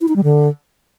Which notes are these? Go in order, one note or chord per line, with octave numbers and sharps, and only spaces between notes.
E4
D#4
G3
D3